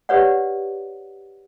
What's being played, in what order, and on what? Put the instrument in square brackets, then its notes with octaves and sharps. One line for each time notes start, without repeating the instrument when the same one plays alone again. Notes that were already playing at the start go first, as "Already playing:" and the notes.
[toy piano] G4 B4 C#5 D5 F#5